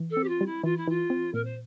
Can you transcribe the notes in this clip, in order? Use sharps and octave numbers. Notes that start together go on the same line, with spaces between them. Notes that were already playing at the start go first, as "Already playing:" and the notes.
Already playing: E3
A4
C4
G4
F4
G3
E4
E3 F4
E4
E3 F4
C4
A#2 A#4
C5